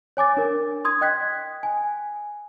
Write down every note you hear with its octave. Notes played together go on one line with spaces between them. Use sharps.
C#5 G#5 D6 A6
D4 A#4
C6 D#6 G#6
D#5 G5 F#6 G#6 B6
G#5